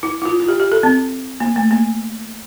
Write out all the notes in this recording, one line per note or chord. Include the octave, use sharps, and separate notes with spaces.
E4
E4
F4
F4
G4
G4
A4
C4
A#3
A3
A#3